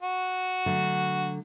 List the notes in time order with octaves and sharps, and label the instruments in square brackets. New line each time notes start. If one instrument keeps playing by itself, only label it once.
[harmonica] F#4
[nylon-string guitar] D3 F#3 A3